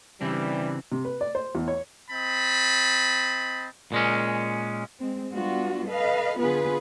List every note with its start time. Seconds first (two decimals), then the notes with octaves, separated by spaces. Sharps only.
0.21 C#3 E3 G3 C4 D4
0.92 C3
1.05 B4
1.21 D5
1.35 C5
1.55 E2
1.68 C#5
2.11 C4 D#5 A5 B5
3.92 A#2 G#3 C#4
5.00 G#3 C4
5.33 G3 B3 D4 F4 F#4
5.86 A4 B4 D#5 F5
6.39 D3 B3 F4 G#4 B4